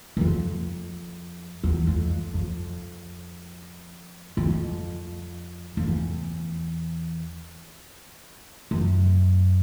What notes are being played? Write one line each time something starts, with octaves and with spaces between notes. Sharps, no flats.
F#2
F2
E2
F2
F2
F2
E2
F2
F2
E2
F#2